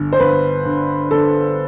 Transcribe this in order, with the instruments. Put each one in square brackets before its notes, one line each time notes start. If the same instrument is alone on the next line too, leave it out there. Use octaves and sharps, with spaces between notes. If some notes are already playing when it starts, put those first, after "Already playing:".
Already playing: [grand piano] G1 D3
C5
G1 B4
D3
D3 A4